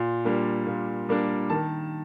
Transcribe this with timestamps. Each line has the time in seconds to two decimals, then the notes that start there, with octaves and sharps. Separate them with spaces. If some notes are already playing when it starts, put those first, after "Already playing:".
Already playing: A#2 C6
0.24 G3 A#3 D4
0.67 A#2
1.09 G3 A#3 D4
1.50 D#3 A5